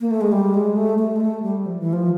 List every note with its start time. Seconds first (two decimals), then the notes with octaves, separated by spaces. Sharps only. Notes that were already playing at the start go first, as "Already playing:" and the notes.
0.01 A#3
0.11 A3
0.21 G#3
0.32 G3
0.54 G#3
0.76 A3
0.99 A3
1.16 G#3
1.20 A3
1.43 G3
1.66 F3
1.79 E3
1.93 F3